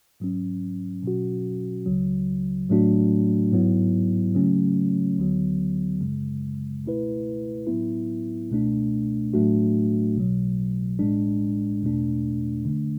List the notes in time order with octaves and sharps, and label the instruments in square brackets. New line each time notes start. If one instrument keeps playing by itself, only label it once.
[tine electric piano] G#2 F#3 C#4
B2 F#3 C#4 F#4
C#2 C#3 F#3
A2 F#3 A3 D4 F#4
G#2 F#3 B3 E4
C#3 F#3 A3 C#4
D2 D3 F#3 B3
G#1 F#2 C#3 G#3
C#2 B2 A3 E4 B4
A2 F#3 B3 E4
C#2 B2 A3 D4
A2 F#3 A3 D4 F#4
B1 B2 F#3
A1 A2 G#3 D4
E2 B2 A3 D4
D3 A3 D4